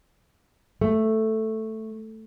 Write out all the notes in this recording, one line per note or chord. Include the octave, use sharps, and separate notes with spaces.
A3